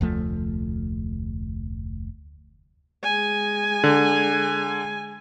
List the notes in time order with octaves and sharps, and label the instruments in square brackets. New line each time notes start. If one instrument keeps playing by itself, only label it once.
[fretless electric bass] F1 D2 F3 A3
[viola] G#3 G#5
[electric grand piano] D3